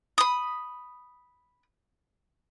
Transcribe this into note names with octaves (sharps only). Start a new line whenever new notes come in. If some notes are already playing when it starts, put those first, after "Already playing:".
B5 D#6